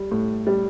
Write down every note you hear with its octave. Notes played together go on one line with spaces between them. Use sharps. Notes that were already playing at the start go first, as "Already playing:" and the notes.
Already playing: G3
A2
G3